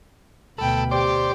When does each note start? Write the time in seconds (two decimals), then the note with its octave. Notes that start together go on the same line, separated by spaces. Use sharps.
0.58 D2 B2 A4 G5 B5
0.91 G4 C5 D5 G5